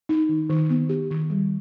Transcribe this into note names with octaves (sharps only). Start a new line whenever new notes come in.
D#4
D#3
D#3
B3
G4
D#3
G3